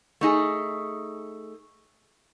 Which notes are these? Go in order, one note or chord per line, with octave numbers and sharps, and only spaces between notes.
A3 D#4 G#4